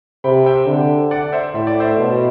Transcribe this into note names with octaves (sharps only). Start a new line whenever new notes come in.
C3 G5 B5
E5 G5
D3
D5 F#5
C5 E5
A2 E5
D5
C5 E5
B2